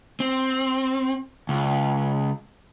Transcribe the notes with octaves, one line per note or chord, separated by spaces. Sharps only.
C4
C#2